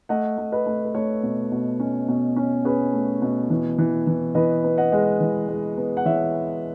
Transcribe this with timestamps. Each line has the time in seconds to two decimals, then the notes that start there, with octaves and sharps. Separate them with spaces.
0.09 A3 D#5 F#5
0.38 A3
0.52 B4 D#5
0.66 A3
0.85 B4
0.95 A3 A4 C#5
1.23 B2
1.52 B2
1.80 C#4
2.09 B2
2.36 C#4
2.65 C#4 G#4 B4
2.93 A3
3.22 B2
3.50 E3
3.78 E3
4.07 E3
4.35 E3 B4 D#5
4.64 B3
4.78 D#5 F#5
4.92 G#3
5.20 E3
5.49 G#3
5.77 B3
5.97 F#5
6.06 E3 C#5 E5